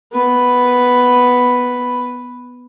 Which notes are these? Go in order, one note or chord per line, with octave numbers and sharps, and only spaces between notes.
B3 B4